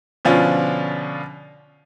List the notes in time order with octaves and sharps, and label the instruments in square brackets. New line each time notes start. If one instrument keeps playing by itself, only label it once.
[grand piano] B2 D3 F3 C#4 D4 F4